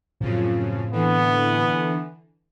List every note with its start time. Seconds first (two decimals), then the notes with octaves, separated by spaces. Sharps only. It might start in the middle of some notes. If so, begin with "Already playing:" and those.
0.20 F#2 A2 C#3 F3 C4
0.92 D3 E3 B3